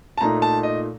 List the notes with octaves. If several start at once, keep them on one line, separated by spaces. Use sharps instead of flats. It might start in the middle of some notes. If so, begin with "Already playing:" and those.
A5
A#2 A3 D#4 A#5
A5
D#5